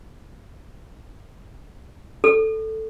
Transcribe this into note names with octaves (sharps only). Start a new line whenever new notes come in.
A4